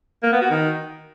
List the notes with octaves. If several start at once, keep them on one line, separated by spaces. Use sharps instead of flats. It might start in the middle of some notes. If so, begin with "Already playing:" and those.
A#3
B3
F#4
D#3